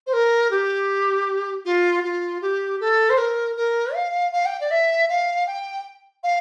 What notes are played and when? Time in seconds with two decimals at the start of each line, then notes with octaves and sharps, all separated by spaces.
0.07 C5
0.13 A#4
0.51 G4
1.65 F4
2.03 F4
2.42 G4
2.80 A4
3.10 C5
3.18 A#4
3.57 A#4
3.94 F5
4.33 F5
4.45 G5
4.61 D5
4.71 E5
5.09 F5
5.47 G5
6.23 F5